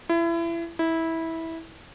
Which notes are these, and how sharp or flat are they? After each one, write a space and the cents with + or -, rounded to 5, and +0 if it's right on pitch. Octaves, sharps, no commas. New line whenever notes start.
E4 +30
E4 -15